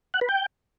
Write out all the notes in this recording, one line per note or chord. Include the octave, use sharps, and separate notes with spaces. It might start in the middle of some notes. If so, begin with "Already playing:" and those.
F#5
B4
G5